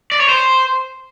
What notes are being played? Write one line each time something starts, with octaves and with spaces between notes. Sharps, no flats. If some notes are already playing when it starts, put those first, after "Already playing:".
D5
C#5
C5